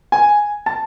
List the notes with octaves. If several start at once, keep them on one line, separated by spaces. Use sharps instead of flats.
G#5
A5